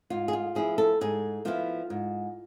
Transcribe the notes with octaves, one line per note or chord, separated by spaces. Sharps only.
G#2 F4
G#4
F4
F3 B3 E4 G#4
A4
G#2 G#4
F3 B3 E4 F4
G#2